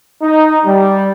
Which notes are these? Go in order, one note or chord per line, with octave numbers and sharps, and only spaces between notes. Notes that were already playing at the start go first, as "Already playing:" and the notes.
D#4
G3